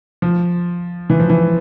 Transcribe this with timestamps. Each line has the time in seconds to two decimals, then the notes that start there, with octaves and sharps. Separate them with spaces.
0.22 F3
1.10 E3
1.20 F3
1.30 E3